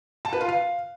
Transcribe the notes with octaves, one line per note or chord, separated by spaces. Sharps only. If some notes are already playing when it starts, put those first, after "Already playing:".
A5
B4
F4
F5